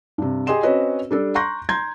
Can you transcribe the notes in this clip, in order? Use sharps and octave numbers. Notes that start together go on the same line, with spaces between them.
G2 C3
G4 G#4 D#5 C6 E7
C4 C#4 F#4 B4 C#5 D#5
G3 D4 A4
A#5 C6 C#6 F#6 G6 A#6
A#5 C6 G6 G#6 A#6